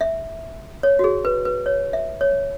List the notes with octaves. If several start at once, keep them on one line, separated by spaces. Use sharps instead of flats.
E5
C#5
F#4
G#4
B4
B4
C#5
E5
C#5